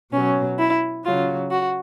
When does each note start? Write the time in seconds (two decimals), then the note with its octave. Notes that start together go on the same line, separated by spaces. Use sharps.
0.13 B2 F#3 C#4
0.59 E4
1.04 C#3 F#3 F4
1.51 F#4